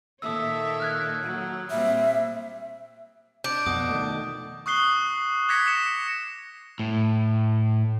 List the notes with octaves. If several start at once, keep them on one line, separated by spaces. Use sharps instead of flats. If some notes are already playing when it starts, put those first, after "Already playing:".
A#2 D#3 A4 C#5 E5 D#6 E6
F6 F#6 G#6
F#3
A#2 G3 C4 E5
D4 G6 D7
F2 B2 D#6
D#3 A3
C#6 D#6 F#6 C7 G7
D6 F#6 G#6 A#6 B6 C#7
D6 A#6 C#7 E7
A2